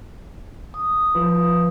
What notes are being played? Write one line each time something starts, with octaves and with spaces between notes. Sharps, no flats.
D#6
F3 F4 B4